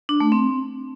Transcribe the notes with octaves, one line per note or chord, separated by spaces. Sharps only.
D4
A3
C4